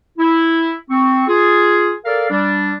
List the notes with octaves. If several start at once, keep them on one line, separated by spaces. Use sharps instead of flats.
E4
C4 C#6
F4 G#4
A4 A#4 D5 F5
G3 D4